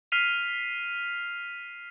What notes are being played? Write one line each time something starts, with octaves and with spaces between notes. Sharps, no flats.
F6 B6 C7 D#7 F7